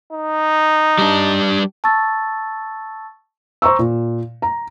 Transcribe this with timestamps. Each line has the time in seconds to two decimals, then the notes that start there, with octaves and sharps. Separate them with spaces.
0.13 D#4
0.98 G3 D4
1.84 A5 C#6 E6 A6
3.62 C5 A#5 C#6 E6
3.79 A#2
4.42 A#5